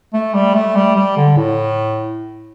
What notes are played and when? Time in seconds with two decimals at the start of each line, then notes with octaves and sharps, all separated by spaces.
0.13 A3
0.34 G3
0.54 A3
0.76 G3
0.96 G3
1.17 D3
1.37 A2